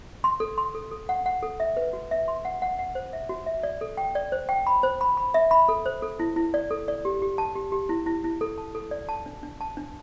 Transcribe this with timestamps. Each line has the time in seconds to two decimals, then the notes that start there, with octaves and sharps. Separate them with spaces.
0.24 C6
0.40 A4
0.58 C6
0.75 A4
0.92 A4
1.09 F#5
1.26 F#5
1.43 A4
1.60 E5
1.77 B4
1.93 F#4
2.11 E5
2.28 C6
2.45 F#5
2.62 F#5
2.79 F#5
2.95 C5
3.13 E5
3.29 F#4
3.46 E5
3.63 D5
3.81 A4
3.97 G5
4.15 D5
4.32 C5
4.49 G5
4.67 B5
4.83 C5
5.01 B5
5.17 B5
5.34 E5
5.51 B5
5.69 A4
5.86 C5
6.02 A4
6.20 E4
6.36 E4
6.54 D5
6.71 A4
6.88 D5
7.05 G4
7.22 G4
7.38 A5
7.55 G4
7.72 G4
7.89 E4
8.06 E4
8.24 E4
8.41 A4
8.58 A5
8.75 A4
8.91 D5
9.09 A5
9.26 D4
9.43 D4
9.61 A5
9.77 D4